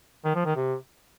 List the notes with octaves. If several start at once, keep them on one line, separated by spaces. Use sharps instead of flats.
D#3
F3
D#3
C3